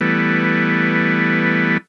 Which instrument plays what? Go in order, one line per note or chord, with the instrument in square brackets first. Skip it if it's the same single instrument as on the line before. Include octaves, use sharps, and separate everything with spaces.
[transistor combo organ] E3 G3 A3 B3